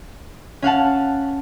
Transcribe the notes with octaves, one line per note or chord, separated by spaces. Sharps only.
C#4 F5 F#5 A5